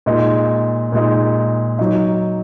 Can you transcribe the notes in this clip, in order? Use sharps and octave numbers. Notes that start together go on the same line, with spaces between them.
A#2 G#3 D#4
A#2 G#3 D#4
F#3 D#4